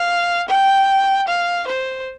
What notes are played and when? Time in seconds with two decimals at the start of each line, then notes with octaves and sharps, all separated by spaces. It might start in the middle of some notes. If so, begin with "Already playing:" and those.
Already playing: F5
0.49 G5
1.28 F5
1.68 C5